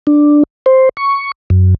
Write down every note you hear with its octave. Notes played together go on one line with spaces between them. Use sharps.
D4
C5
C#6
F#2